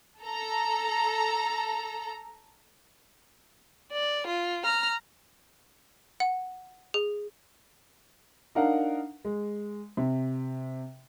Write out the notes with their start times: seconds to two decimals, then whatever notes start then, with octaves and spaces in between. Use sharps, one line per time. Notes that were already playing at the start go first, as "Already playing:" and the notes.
0.22 A4 A#5
3.92 D5
4.27 F4
4.65 A#5 F6
6.20 F#5
6.94 G#4
8.55 D4 D#4 A#4 F5 F#5
9.25 G#3
9.97 C3